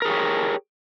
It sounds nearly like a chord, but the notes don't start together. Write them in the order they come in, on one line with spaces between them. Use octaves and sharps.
A#4 G#4 G4 C#5